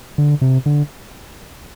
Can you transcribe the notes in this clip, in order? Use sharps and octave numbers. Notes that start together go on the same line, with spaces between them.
D3
C3
D3